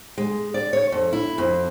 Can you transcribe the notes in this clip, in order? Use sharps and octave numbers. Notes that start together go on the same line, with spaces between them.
G#3
D5
C#5
F2
E4
F2